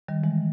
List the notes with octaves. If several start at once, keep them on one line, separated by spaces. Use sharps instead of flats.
D#3 G3
E3 G#3